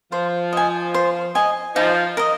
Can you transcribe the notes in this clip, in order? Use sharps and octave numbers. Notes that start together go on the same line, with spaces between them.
F3 C5
D#5 G#5
C5
D#5 G#5
F3 D#4
A#4 D#5